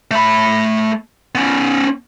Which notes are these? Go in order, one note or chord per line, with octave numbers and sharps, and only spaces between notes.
A3 B5
B3 C#4